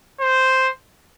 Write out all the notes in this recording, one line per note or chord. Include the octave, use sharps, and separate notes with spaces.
C5